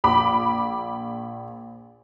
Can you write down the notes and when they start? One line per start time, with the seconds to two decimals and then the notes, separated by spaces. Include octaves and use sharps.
0.04 A#1 B5 D6